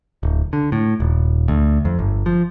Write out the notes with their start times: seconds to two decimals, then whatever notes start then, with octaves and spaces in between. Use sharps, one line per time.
0.23 D1
0.53 D3
0.72 A2
1.00 D#1
1.48 D2
1.85 F2
1.99 G1
2.26 F3